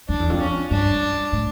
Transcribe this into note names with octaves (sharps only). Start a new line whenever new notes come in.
F2 D4
E2
F2
C#4
G2 D4
A2